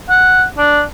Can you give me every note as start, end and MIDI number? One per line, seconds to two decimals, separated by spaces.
0.09 0.44 78
0.58 0.82 62